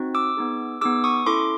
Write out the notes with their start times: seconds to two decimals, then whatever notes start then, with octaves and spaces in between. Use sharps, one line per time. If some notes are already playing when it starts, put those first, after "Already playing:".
Already playing: C4 D#4 F#4
0.15 D6 E6
0.37 B3 D#4 G#4
0.81 B3 D#4 G#4 D6 E6
1.04 C#6 D#6
1.26 C#4 E4 A4 C6 D6